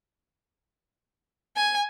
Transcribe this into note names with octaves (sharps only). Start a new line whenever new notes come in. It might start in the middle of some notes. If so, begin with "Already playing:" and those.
G#5